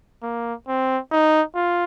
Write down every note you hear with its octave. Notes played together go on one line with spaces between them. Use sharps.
A#3
C4
D#4
F4